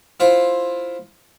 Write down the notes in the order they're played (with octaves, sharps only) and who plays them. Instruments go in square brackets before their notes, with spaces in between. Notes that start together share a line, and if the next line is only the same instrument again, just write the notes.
[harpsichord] E4 F4 C5